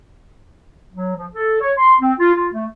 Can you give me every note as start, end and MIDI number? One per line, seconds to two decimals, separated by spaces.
0.93 1.14 54
1.16 1.26 53
1.33 1.60 69
1.61 1.72 73
1.77 1.95 84
2.00 2.13 60
2.19 2.34 65
2.35 2.47 65
2.53 2.65 57